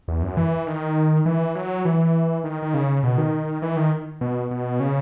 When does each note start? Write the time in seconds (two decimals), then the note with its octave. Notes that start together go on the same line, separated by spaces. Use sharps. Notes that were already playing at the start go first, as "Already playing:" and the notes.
0.08 E2
0.22 F#2
0.37 E3
0.67 D#3
1.26 E3
1.55 F#3
1.85 E3
2.44 D#3
2.62 D#3
2.74 C#3
3.03 B2
3.18 D#3
3.62 E3
3.77 D#3
4.21 B2
4.51 B2
4.80 C#3